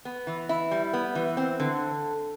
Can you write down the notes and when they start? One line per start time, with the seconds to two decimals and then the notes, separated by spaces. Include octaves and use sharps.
0.05 B3
0.27 E3
0.49 E4
0.71 G3
0.93 B3
1.15 E3
1.37 C4
1.60 D3